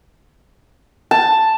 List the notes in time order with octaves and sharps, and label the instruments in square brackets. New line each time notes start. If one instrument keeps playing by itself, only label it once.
[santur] A5